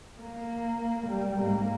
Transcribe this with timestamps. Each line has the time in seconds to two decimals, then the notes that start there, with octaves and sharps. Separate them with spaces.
0.21 A#3
1.07 G3
1.39 G#2 A#3